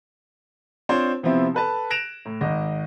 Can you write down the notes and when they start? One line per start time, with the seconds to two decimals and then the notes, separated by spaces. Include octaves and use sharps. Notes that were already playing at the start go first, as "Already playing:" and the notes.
0.89 C4 D4 F4 C5 C#5
1.23 C3 F3 B3 C4 E4
1.54 A4 B4 A5
1.90 F#6 A#6 D7 E7 F7
2.25 A2
2.41 G#1 D#5